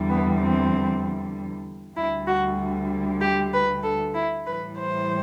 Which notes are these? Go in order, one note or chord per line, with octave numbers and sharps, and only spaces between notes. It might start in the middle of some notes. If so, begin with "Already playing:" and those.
Already playing: E2 D3 G3
B3
C4
D2 D3 G3 E4
F#4
G4
B4
A4
E4
A2 E3 G3 B4
C5